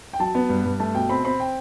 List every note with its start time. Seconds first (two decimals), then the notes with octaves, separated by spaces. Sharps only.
0.13 G5
0.20 F#3 A5
0.35 B3
0.49 G2
0.65 G2
0.79 A3 A5
0.94 B2 G5
1.09 C4 B5
1.24 C4 B5
1.40 G5